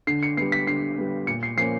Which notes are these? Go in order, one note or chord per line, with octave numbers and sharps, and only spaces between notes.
D3 C7
C#7
G3 B3 C7
B6
D3 C7
G3 B3
A#2 C#7
C7
F3 A#3 C#4 C7